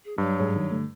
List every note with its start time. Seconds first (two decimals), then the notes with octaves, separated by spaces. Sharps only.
0.05 G#4
0.18 G2 F#3
0.40 G#2 G#4 C#5
0.56 D#3
0.71 D3 A3